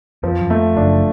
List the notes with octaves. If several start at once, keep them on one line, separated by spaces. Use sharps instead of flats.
F2 F3
F#2
F2 A3
F#1 F#2 D4